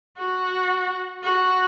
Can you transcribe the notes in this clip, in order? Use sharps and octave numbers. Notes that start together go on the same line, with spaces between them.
F#4
F#4